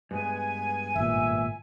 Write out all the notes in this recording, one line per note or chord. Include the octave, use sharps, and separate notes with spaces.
G2 G#3 B3 G#5
G#1 A#2 E5